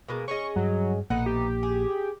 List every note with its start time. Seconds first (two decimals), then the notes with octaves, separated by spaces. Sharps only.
0.08 B2 G#3 A#3
0.28 C#4 G#4 D#5 C#6
0.56 G2 F#3
1.10 A#1 B2 A3 A#3 D#4 F#5
1.26 G4
1.63 G#4